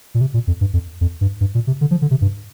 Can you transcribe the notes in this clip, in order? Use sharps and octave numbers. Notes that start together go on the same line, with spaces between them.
A#2
C3
A#2
F2
G2
F2
F2
G2
G2
A#2
C3
D3
F3
D3
C3
G2